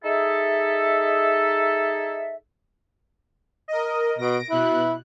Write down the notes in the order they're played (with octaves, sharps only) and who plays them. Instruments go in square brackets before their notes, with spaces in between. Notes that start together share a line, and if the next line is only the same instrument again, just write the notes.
[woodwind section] D#4 G#4 A4 E5
[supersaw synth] A#4 D#5
[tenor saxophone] B2 [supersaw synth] A#6 D7
[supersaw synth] B2 F#6 [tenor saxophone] E4